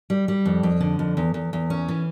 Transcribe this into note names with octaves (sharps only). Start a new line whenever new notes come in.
G3
G3
F2
F2
D3
F2
E2
E2
E2
C#4
E3